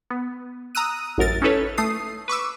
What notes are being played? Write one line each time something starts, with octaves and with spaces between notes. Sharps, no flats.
B3
A#5 D#6 E6 F#6 D#7
A1 F#2 A#4 A6
C#4 D#4 E4 A4 B4 C#5
A3 D#6 C7
B4 C#6 D6 E6